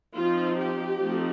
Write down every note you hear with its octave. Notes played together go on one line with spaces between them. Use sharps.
F3 C4 D#4 F4
G4
F3 A3 C4 D#4